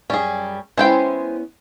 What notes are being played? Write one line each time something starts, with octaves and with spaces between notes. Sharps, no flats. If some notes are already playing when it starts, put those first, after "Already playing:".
F#2 G3 C#4 G#4
G#3 B3 C#4 E4 C5 G5